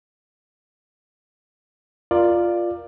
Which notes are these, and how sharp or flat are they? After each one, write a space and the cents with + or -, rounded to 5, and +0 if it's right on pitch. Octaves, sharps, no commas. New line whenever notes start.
F4 +0 A#4 +0 D5 +15